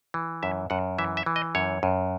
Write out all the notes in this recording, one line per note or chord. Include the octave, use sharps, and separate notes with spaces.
E3
F#2 E5
F#2 F#5
E3 E5
E5
E3
D#5
F#2 C#5
F#2